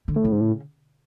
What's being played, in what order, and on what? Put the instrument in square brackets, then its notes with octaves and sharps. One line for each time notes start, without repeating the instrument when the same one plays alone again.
[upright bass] D3
[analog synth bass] A2
[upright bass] C#3
[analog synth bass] G#2
A2